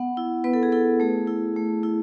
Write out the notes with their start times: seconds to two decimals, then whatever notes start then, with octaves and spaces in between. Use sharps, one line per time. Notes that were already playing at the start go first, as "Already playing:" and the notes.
Already playing: B3 F#5
0.17 E4
0.44 B3 B4
0.53 A4
0.63 G#4
0.72 E4 A4
1.00 A3 G#4
1.27 E4
1.56 A3
1.83 E4